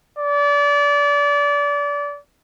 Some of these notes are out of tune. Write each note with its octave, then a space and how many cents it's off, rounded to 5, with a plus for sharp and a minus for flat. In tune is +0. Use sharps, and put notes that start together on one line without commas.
D5 -30